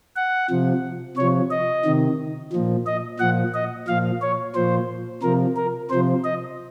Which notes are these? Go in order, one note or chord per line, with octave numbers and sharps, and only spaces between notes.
F#5
C3 F3
C3 F3 C#5
D#5
C3 D#3
A#2 F3
D#5
A#2 F3 F#5
D#5
A#2 F3 F5
C#5
A#2 F3 C5
C3 F3 A#4
A#4
C3 F3 C5
D#5